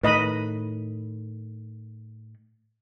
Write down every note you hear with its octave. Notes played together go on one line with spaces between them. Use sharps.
A2 D#3 B4 D#5 B5